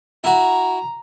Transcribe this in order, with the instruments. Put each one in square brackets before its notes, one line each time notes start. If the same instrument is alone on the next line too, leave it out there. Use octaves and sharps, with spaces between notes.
[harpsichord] E4 F#4 [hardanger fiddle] A#5